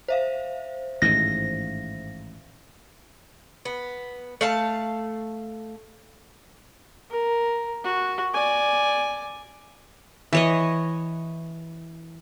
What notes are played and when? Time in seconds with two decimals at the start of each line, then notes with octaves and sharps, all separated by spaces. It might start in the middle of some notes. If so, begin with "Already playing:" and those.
0.08 C5 E5 F5
1.02 A1 G#2 D#3 A#6
3.65 B3
4.41 A3 F5 A5
7.10 A#4
7.84 F#4
8.34 D5 G#5
10.33 E3 C#5 D#5